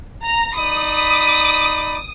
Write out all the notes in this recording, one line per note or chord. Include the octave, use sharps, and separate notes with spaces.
A#5
D#4 D5 B5 D#6